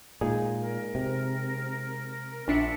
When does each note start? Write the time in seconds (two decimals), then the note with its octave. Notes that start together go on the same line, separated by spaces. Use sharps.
0.21 A#2 G#3 D#4 G#4
0.60 A#4
0.95 C3
2.48 A#1 D4 E5 C#7